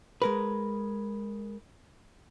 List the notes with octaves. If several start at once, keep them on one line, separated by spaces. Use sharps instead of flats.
G#3 A#4 B4